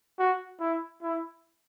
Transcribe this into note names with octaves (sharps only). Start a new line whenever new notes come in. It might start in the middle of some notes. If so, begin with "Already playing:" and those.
F#4
E4
E4